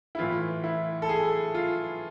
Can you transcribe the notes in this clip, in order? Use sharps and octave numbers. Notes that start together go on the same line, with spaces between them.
E4
A2 E3 F4
E4
A4
G#4
F4